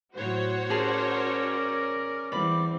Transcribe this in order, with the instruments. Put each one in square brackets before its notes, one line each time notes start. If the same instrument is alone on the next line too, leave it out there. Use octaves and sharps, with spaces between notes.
[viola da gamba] A2 F#3 [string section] F#4 C5 C#5
[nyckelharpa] C#4 D5 [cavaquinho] G#4 A5 C6 [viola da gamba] A#4
[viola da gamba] E2 G3 C4 [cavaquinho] D5 B5